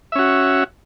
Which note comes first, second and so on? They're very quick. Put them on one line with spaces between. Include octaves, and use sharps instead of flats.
E5 C#4 F#4